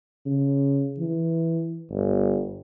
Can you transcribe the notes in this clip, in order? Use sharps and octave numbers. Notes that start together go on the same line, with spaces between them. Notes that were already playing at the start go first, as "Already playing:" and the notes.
C#3
E3
G1